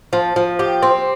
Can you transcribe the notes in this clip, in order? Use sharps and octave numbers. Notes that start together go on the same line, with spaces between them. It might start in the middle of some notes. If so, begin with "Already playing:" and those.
F3
F3
G4
C4